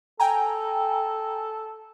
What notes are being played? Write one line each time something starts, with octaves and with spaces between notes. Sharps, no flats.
A4 G5 G#5 A#5